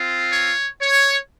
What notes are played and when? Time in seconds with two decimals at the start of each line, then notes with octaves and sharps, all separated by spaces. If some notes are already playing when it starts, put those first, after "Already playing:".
Already playing: C4 F4
0.31 C#5
0.81 C#5